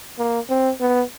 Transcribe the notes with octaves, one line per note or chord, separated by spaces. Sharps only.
A#3
C4
B3